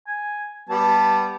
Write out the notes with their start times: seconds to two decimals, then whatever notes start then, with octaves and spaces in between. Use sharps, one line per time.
0.07 G#5
0.69 G3 B3 A5